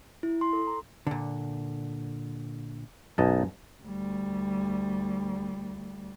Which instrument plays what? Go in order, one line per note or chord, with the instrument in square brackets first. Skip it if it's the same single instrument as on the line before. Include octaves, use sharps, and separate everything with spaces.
[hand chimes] E4
C6
A4
A#5
[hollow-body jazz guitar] A#2 D3
[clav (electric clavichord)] B1 D#5 A5 [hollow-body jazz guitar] F#2
[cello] D2 G3